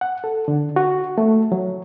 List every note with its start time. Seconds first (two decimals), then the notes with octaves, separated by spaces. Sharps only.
0.01 F#5
0.24 A4
0.48 D3
0.76 F#4
1.18 A3
1.52 F#3